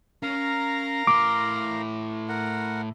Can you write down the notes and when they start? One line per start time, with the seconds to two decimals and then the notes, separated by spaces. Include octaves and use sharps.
0.23 C#4 A#4 F5 A#5
1.07 A2 C6 D6
2.29 A#4 F#5